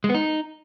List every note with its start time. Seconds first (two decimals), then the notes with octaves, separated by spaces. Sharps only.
0.04 G#3
0.09 B3
0.14 D#4